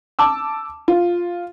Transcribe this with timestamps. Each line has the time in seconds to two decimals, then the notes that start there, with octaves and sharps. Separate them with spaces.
0.19 A5 D6 E6
0.88 F4